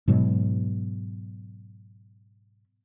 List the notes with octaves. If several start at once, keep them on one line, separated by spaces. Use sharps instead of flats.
G#2 B2 F#3